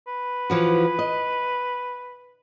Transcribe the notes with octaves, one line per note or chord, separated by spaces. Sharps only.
B4
E3 F3 F#4
D#5